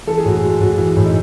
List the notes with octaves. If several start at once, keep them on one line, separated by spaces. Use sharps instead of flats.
E3 A4
G#4
A2 F#4
G#4
G#3
A2 F#4
E3
A2
D#4